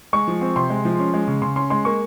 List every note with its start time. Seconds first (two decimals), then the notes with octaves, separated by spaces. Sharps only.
0.13 G#3 C#6
0.28 F3
0.41 C4
0.56 C3 C6
0.70 G#3
0.85 F3
0.99 C#4
1.14 G#3
1.28 C#3
1.42 C#3 C6
1.56 C#4 C6
1.70 G#3 C6
1.85 A#3 C#6